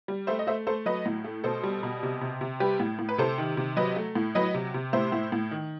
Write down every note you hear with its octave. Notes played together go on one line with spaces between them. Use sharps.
G3
A3 C5 E5
D#5
A3 C5 E5
A3 A4 C5
F#3 B4 D#5
A2
A3
B2 A4 C5
G3
B2
C3
C3
C3
G3 G4 B4
A2
A2
B4
C3 A4 C5
D#3
C3
F#3 B4 D#5
A3
A2
F#3 B4 D#5
C3
C3
A2 C5 E5
A2
A2
D#3